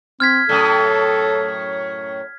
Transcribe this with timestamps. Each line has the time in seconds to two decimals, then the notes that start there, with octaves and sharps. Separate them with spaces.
0.20 C4 F6 G#6 B6
0.49 F#2 A2 A4